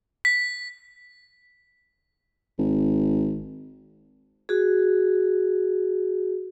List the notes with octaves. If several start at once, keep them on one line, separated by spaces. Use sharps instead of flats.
B6
G#1
F#4 G#4